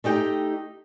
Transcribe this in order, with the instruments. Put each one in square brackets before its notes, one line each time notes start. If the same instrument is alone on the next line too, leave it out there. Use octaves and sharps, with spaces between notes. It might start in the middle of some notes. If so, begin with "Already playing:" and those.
[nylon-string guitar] A3 D#4 G4 G5